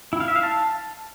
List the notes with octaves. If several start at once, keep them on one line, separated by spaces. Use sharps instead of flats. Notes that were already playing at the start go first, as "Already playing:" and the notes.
E4
F5
E5
F5
A5